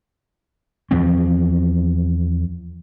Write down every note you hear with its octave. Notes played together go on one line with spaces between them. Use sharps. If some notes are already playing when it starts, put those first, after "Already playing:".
E2 F3 C4